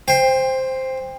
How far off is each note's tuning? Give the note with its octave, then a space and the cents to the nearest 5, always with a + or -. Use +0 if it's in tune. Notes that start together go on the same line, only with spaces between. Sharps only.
C5 +0 G5 +25